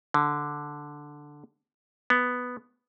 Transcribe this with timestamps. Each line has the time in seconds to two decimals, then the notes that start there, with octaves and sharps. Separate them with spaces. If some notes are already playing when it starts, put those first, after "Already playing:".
0.14 D3
2.10 B3